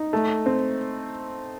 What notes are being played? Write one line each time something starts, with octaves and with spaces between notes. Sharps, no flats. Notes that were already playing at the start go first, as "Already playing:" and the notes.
Already playing: D#4
A3
C4